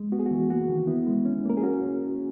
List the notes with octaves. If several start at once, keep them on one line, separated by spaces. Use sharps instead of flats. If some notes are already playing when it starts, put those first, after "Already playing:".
Already playing: G#3
B3 F#4
G#4
F#4
E3
A#3 F#4
D#3
B3 E4
G#3
C#4
A#3 A#4
G#4
C#4 F#4